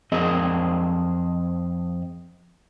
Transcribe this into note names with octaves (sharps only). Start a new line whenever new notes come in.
F2 C4 G#4 D#5